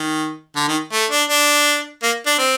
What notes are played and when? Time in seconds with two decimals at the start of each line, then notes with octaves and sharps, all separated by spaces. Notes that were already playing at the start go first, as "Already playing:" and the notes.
Already playing: D#3
0.56 D3
0.68 D#3
0.93 A3
1.10 D4
1.29 D4
2.03 A#3
2.26 D4
2.38 C4